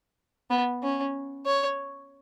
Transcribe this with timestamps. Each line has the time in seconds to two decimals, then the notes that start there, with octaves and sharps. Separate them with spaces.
0.50 B3
0.83 C#4
1.46 C#5